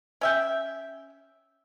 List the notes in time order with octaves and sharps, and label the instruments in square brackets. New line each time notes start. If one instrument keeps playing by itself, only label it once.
[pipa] C#4 E5 G5